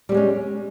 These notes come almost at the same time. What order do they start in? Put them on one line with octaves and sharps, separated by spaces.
G3 C4 G#3 C#4